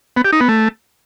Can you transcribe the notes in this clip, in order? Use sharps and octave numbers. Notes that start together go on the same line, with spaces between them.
B3
G4
D#4
B3
A3